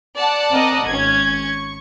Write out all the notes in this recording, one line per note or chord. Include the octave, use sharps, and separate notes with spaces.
D5 F#5 A5
C4 A#4 D#5
G#1 C#4 G#6
C#6